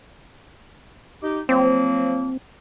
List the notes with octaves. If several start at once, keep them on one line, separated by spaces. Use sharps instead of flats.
D#4 G4
F3 F#3 A#3 C4